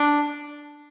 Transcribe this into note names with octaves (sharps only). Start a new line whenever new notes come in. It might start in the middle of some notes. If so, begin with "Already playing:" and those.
Already playing: D4